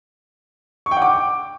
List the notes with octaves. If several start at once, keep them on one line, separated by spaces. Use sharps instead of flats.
C#6
G5
F#5
D6